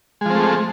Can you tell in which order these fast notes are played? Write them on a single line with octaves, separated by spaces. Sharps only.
G#3 F3 C4 A3